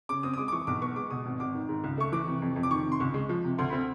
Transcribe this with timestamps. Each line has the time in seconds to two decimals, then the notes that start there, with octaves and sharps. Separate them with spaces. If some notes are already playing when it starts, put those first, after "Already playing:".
0.09 C#3 D6
0.23 C4 D#6
0.34 D#6
0.38 G#3 D6
0.48 D6
0.52 E3 C#6
0.67 B1 D6
0.82 B3 C#6
0.96 G#3 D6
1.10 B2 D#6
1.26 G#1
1.40 G#1 D6
1.54 D#3
1.69 G#2
1.84 C#2
1.98 A3 C#6
2.12 E3 D6
2.27 C3
2.42 F2
2.56 F2
2.63 D6
2.71 D#3 C#6
2.86 C3
2.92 C6
3.00 C#2 C#6
3.14 G#3
3.29 F3
3.44 C3
3.58 D2 C6
3.70 C4 B5